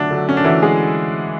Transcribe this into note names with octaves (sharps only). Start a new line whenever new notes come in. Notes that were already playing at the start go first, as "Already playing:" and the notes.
Already playing: D3 F#3 A3 D4
D3 F#3 A3
C#4
D4
D3 E3 F#3 A3 E4
G#3 G#4